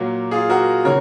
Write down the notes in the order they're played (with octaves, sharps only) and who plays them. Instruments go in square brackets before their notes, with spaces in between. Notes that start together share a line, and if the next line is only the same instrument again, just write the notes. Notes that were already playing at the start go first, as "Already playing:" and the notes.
Already playing: [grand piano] A#2 F#3 A#3
F4 G#4
F#4 A#4
C#3 A#4 C#5